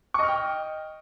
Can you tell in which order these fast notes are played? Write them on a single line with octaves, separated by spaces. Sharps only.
C#6 D#5 F6 G5